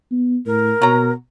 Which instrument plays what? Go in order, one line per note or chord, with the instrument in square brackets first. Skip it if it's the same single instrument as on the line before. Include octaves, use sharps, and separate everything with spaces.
[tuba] B3
[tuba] A2 [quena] A#4
[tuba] B2 [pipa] F#3 A#5